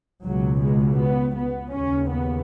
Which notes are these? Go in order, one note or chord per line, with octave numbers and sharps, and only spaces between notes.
C#2 B2 F#3
G#3
B3
B3
D#2 C#3 C#4
B3